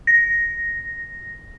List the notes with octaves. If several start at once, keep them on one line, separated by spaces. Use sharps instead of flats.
A#6